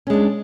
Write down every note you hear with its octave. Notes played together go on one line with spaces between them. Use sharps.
G#3 C#4 D4